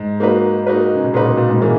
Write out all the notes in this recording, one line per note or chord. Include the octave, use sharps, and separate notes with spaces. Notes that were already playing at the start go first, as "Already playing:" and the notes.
Already playing: G#2
A#3 D#4 F#4 B4
A#3 D#4 F#4 B4
C#3
B2
A#2 A#3 D#4 F#4 B4
B2
A#2
G#2
A#2 E3 A#3 C#4 G#4